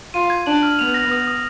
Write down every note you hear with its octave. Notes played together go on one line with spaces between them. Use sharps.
F4 D#7
G#6
D4 F#7
F6
B3 F7
A#6
D#6
D#6